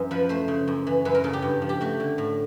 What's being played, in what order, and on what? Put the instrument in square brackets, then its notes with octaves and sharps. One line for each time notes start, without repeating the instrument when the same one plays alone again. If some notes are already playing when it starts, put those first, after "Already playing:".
Already playing: [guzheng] F#2 E3
F3 B4
A3 C5
C#3
F#2
E3
F#2 B4
A#4
C#3 A4
G4
G2
F3
G4
A3 F#4
D3
A2